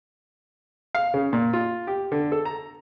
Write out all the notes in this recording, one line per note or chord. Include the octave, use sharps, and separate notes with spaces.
F5
C#3
A#2
F4
G4
D3
A4
A#5